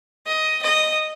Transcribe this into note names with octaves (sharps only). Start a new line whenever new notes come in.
D#5
D#5